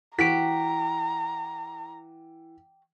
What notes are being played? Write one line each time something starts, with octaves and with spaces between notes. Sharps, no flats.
E3 F#4 G4 G5 A#5 B6 D7